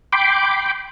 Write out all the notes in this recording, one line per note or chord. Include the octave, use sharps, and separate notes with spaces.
G5 B5 C6 D6